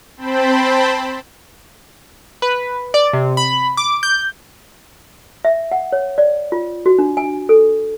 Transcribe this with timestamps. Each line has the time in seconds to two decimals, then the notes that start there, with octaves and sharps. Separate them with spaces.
0.17 C4 C5 G5 A5 B5
2.42 B4
2.94 D5
3.13 C3
3.37 B5
3.77 D6
4.03 G6
5.45 E5
5.72 F#5
5.92 C#5
6.18 D5
6.52 F4
6.86 F#4
6.99 D4
7.17 G#5
7.49 A4